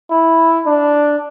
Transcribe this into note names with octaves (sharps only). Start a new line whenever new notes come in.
E4
D4